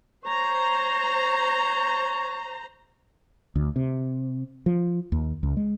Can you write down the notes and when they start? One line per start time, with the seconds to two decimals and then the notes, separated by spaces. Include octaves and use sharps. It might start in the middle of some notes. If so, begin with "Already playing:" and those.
0.25 C5 C#5 A#5
3.56 D2
3.76 C3
4.66 F3
5.12 D#2
5.43 C#2
5.57 G#3